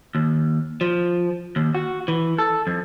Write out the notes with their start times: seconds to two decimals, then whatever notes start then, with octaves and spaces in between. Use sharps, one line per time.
0.15 D#2
0.81 F3
1.56 D#2
1.75 F#4
2.08 E3
2.38 A4
2.67 F2